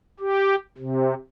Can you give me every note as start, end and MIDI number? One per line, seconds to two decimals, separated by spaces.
0.20 0.55 67
0.77 1.14 48